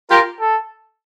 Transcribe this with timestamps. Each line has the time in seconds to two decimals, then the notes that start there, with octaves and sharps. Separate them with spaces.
0.11 F4 G4 A#4
0.40 A4